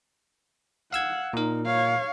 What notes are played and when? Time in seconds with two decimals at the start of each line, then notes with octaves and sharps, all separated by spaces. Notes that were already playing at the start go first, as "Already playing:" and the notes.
0.93 F5 F#5 E6 G#6
1.33 A#2 D#4 A#4
1.66 C#5 F5